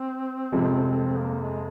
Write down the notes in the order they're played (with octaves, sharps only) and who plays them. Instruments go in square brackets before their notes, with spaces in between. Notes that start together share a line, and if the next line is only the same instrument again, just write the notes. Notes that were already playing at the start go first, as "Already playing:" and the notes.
Already playing: [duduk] C4
[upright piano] F1 F2 C3 F3 G#3
[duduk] A#3
G#3